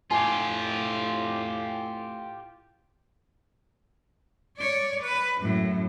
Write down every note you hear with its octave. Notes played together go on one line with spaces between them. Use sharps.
A2 F4 G4 G#5
C#5 D5
B4
F#2 A2